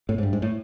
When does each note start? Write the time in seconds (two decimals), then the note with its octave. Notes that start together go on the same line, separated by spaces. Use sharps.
0.09 A2
0.18 G#2
0.23 G2
0.33 G#2
0.42 A2